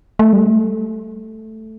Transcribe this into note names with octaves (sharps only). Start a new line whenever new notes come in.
A3
G3
A3